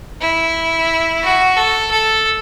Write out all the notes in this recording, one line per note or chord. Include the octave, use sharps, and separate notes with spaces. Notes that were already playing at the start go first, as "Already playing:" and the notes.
E4
F#4
A4
A4